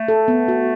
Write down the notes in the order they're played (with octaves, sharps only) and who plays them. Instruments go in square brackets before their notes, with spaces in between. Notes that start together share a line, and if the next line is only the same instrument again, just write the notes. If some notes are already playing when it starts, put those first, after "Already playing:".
Already playing: [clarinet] A3
[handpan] A4
B3
F#4